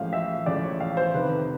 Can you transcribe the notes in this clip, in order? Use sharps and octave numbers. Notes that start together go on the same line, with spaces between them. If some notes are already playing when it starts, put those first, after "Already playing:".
Already playing: A1 A2 F3 G#3 F5
E5
A1 A2 F3 G#3 D5
C#5
F5
C5
F1 F2 C3 D#3 B4